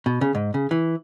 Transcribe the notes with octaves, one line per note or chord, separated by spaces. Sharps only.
B2
C#3
G#2
C#3
E3